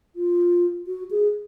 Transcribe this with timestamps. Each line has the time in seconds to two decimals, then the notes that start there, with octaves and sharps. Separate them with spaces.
0.16 F4
0.87 F#4
1.11 G#4